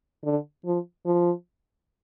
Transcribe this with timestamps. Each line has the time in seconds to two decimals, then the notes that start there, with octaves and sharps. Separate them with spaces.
0.24 D3
0.65 F3
1.06 F3